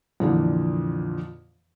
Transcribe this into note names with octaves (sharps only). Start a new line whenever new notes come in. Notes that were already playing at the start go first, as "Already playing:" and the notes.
F2 A#2 D3 E3